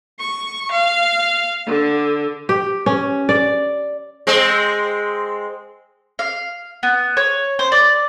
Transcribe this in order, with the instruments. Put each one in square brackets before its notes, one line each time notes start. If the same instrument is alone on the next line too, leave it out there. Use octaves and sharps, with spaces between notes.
[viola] C#6
F5
D3
[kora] G4
C#4
D5
[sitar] G#3 C4
[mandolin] F5
B3
C#5
C5
D5